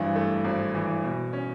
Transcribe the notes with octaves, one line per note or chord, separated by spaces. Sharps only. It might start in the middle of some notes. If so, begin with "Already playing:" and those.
Already playing: G#1 G2 E3
A3
G#1
E3
B2
C#4